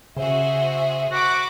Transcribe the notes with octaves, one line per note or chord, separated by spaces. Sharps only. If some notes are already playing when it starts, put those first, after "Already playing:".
C#3 F#4 G#4 C5 E5
F#4 F#5 B5 D6